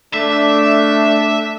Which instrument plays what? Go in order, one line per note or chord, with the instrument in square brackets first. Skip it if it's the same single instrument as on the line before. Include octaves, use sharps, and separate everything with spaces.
[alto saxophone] A3 [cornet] D4 [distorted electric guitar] E5